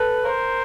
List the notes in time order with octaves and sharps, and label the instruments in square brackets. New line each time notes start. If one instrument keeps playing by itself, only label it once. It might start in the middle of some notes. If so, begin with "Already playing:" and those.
Already playing: [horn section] A4 B4
A#4 C5